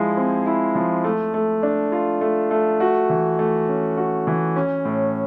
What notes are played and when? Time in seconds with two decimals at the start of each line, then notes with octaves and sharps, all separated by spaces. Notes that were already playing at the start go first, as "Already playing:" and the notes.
Already playing: F3 G#3 E4
0.17 C4
0.46 E4
0.75 F3
1.04 A3
1.34 A3
1.63 D4
1.92 F4
2.21 A3
2.51 A3
2.80 F#4
3.10 E3
3.39 A3
3.68 C#4
3.97 F#4
4.27 E3
4.56 C#4
4.85 A2